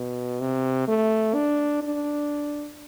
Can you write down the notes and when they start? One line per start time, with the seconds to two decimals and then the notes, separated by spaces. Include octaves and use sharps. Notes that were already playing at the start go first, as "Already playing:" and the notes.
Already playing: B2
0.40 C3
0.88 A3
1.35 D4
1.83 D4